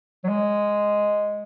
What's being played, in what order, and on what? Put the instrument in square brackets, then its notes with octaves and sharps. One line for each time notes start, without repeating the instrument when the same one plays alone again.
[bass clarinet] F#3
G#3